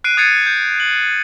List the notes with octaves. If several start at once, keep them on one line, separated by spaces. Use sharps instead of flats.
F#6 C7 D7 D#7
D#6 G#6 A6 C7 C#7 D#7
G6
F#7